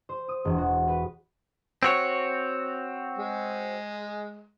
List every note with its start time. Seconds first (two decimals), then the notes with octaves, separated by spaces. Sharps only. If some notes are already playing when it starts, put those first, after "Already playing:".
0.09 C5
0.29 D#6
0.45 E1
0.58 F#4
0.88 B4
1.83 C4 F#4 C#5
3.18 G#3